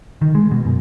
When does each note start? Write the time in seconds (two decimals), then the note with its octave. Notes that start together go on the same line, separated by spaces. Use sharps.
0.21 D#3
0.35 G#3
0.51 B2
0.65 F#2